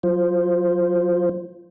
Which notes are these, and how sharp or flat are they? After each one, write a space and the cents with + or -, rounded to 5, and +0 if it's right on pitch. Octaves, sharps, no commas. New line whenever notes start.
F#3 -25 F4 +0 C5 +0